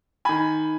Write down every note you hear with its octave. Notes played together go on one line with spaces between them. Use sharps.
D#3 G#5 B5